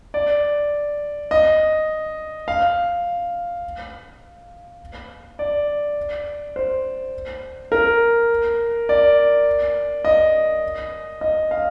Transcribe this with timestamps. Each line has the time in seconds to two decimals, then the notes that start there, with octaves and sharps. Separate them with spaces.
0.14 D5
1.31 D#5
2.48 F5
5.39 D5
6.56 C5
7.72 A#4
8.89 D5
10.05 D#5
11.21 D#5
11.51 F5